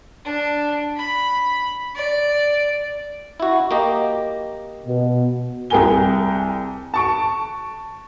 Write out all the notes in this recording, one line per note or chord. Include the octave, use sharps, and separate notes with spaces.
D4
B5
D5
E4 F#4
A#3 G4 D#5
B2
C2 G#4 A#4 G5 G#5 G7
A5 C#6 D7